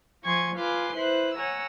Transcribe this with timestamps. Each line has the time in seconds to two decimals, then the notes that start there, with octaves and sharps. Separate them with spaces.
0.25 F3 G#5 C6 C#6 G#6
0.57 F4 B4 G#5 C6 D6
0.95 E4 B4 C5 F#6
1.36 C#5 F#5 G#5 A#5 E6